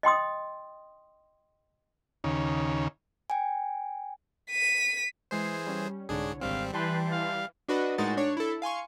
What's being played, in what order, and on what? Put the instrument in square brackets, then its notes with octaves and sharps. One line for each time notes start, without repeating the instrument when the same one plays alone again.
[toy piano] D#5 G5 C6 D#6
[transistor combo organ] D#2 C#3
[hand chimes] G5 G#5
[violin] B6 D#7
[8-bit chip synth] E3 G#4 C5 [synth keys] G#3 C7
[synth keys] G3 C#4
[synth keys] C2 D3 C#5 [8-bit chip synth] G#2 D4 G#4
[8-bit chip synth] G#1 G3 C4 [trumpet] F5
[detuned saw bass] E3 [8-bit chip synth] G3 [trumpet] B4 [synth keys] G5 A5 C6
[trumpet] F5
[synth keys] D4 F#4 B4 D#5
A2 G#3 D#4 F#4 A#4 A6
D4 C#5
E4 A4
F5 G#5 C6 C#6